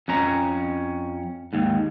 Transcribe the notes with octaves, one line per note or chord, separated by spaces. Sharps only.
F2 C#4 A#5
D#2 G#2